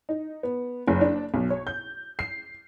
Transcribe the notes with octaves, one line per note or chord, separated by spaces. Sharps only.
D#4
B3
F#1
D4
B1
C#5
G6
C7